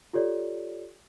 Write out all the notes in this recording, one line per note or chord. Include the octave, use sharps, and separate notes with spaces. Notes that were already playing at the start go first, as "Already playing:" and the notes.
F4 G4 A4 C#5 D5